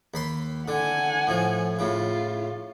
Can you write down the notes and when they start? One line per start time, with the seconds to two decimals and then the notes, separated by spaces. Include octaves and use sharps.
0.14 D#2 B5 C6
0.68 D3 F#5 G#5
1.27 A2 F3
1.79 A2 C#3 F4